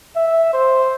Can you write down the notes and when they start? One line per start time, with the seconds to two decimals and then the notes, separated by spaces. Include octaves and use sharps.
0.16 E5
0.53 C5